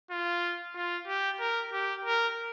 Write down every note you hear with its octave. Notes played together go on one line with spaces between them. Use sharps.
F4
F4
G4
A#4
G4
A#4